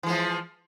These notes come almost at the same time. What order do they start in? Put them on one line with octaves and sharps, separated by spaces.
E3 G#3 F3